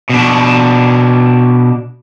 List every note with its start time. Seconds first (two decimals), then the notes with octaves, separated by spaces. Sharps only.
0.10 B2 D4